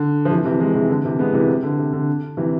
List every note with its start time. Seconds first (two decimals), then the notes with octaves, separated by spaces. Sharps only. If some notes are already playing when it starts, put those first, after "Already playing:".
Already playing: D3
0.25 F3
0.31 C3 E3
0.45 C3 E3
0.60 E3 G#3
0.75 C3 E3
0.89 D3
1.04 C3 E3
1.19 G#3 B3
1.34 C3 E3
1.48 C3
1.63 D3
1.78 C3
1.93 D3
2.37 C3 E3